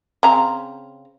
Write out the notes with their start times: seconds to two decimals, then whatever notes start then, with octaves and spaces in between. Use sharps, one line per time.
0.23 C#3 C4 A#5